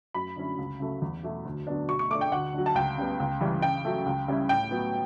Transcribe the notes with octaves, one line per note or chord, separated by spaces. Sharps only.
F#2 B5
D3 F#3 C#4 E4
C#2
C#3 F#3 A3
E2
B2 F#3 A3 E4
D2
D3 F#3 B3 D4
B2 C#6
C#6
A3 D4 D6
G5
D2 F#5
D3 F#3
A5
C#2 G5
C#3 G3 B3
C#2
C#3 E3 G3 C#4
C#3 G5
F#3 A3
C#2
C#3 G3 C#4 E4
A2 G5
F#3 B3